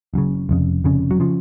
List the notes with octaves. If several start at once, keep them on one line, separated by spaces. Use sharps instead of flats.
F#1 F#2 C#3
F1 F2 C#3
F1 F2 C#3
F#3
C#3 F3